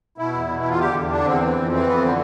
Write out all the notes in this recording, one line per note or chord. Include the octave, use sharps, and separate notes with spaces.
B2 E4
E2
B2
E4
E2
F4
D3 G4
E2
D3 D4
E2 C4
E3
F2
E3 C4
F2 B3
D3 C4